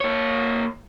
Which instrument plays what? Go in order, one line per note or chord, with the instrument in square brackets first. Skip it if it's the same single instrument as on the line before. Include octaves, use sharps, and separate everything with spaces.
[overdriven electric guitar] A#3 C#5